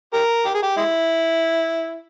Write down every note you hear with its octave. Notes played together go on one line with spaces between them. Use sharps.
G4 A#4
G4
G#4
G4
G#3 E4